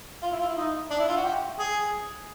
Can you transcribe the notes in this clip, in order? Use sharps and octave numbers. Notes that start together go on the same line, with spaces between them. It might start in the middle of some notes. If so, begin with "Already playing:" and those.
F4
E4
F4
E4
D#4
D4
E4
F4
F#4
G4
G#4